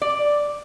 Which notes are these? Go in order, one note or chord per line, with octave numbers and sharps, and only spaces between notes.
D5